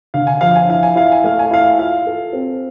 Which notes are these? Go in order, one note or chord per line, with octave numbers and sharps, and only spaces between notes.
D3 F5
G#5
F3 F5
G#5
E4 F5
G#5
E4 F5
G#5
A3 F5
G#5
E4 F5
F4 F5
A4
C4